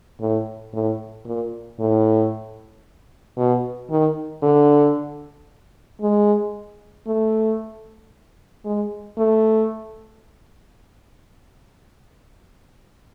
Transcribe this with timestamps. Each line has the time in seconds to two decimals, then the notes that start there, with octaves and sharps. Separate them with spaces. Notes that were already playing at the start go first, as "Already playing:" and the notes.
0.20 A2
0.73 A2
1.26 A#2
1.79 A2
3.37 B2
3.90 D#3
4.42 D3
6.01 G#3
7.07 A3
8.65 G#3
9.18 A3